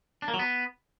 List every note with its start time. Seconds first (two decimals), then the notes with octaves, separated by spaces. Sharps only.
0.22 D4
0.28 A#3
0.34 F#3
0.39 B3